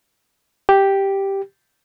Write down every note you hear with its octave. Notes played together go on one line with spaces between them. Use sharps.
G4